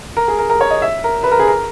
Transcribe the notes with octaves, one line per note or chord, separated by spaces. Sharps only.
A#4
G#4
A#4
A#4
C#5
D#5
E5
A#4
B4
A#4
G#4
A#4